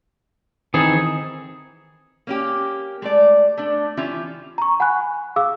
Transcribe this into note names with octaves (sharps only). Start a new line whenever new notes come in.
D#3 E3 C4 D#4 G#4 A4
A#3 C#4 G4
G#3 A3 D5
A3 D4
E3 C#4 F4 G4 E5
A#5 C#6
F#5 G#5 B5 C#6 F#6
G#4 F5 D6 E6